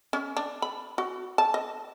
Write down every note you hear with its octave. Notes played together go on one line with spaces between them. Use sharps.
C#4
D4
B5
F#4
A5
D#5